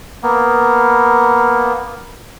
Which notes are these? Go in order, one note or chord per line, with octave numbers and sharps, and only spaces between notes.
A#3 B3